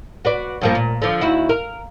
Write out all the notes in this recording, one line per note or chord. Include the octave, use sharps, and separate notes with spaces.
F#4 B4 D5
G2 F3 A#3
A#2
D3 F3
D#2 E4 F#4
A#4